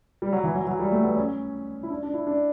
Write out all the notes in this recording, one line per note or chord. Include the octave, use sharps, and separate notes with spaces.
G3
F#3
E3
F#3
F#3
G3
A3
B3
C#4
E4
D4
D4
E4
D4